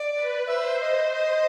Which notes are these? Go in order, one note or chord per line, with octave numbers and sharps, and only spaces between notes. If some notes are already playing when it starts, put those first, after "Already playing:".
Already playing: D5
B4
C5 E5
D#5
D#5